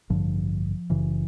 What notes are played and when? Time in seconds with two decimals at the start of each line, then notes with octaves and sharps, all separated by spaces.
0.10 A1 G2 D3 D#3 F3
0.90 F#1 F#2 C#3 E3